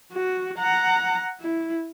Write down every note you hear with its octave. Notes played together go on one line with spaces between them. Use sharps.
F#4
F#5 A#5
E4